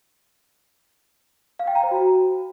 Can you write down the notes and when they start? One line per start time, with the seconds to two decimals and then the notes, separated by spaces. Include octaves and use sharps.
1.59 F5
1.67 G5
1.75 A#5
1.83 C5
1.91 F#4